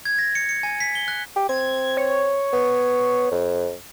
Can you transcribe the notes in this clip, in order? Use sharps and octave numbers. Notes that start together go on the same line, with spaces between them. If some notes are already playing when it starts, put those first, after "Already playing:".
G#6
A#6
C#7
C#7
G#5
B6
G7
F#6
G4
C4 G#6
C#5
B3
F2